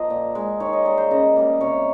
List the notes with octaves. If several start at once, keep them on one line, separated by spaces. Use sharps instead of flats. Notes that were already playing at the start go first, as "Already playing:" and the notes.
Already playing: F3 A#3 C5 D#5
A#2
G#3
D#3 C#5
D#5
G3 A#3 C#5
C5
C#3 D#5
G3 A#3
C3 C#5